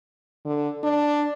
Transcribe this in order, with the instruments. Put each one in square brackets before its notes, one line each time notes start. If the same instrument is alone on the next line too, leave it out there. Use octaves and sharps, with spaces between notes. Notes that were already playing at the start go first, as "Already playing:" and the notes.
[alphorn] D3
D4